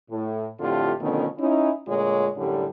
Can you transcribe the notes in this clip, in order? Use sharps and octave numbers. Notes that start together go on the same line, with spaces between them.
A2
F2 A2 D3 A3 F4 G4
B2 D3 D#3 F3 A3 C#4
C#4 D#4 E4
D2 A#2 G#3 F4 C#5
F#2 A2 D3 G3